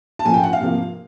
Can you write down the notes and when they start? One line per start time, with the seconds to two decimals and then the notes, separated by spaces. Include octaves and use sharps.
0.19 A5
0.25 A#2 F3 A3 C#4 G#5
0.34 G5
0.43 F#5
0.53 F5
0.61 C3 F3 A#3